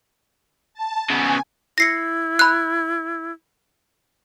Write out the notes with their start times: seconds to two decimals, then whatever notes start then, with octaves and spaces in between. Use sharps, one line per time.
0.74 A5
1.10 C#3 B3 G#5
1.78 E4 A#6 C7 C#7
2.39 B5 F#6